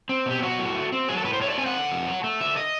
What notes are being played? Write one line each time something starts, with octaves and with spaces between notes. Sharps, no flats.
C4
B2 G4
F#3 F#4
A2
A3
C4
F#3 G#4
A4
A2 B4
C5
A3 C#5
D5
C4 G#5
F#5
D3
F2
F#3
A3
D3 E5
D#5